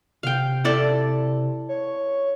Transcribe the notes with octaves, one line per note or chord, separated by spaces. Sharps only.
C3 F5 G5
E4 A4 D5
C#5